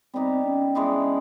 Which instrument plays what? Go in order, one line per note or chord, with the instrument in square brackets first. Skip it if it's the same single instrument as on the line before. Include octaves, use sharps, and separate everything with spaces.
[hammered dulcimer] G3 B3 D#4 G4 [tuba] C4
[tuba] C#4
[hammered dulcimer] E3 G#3 B3 D4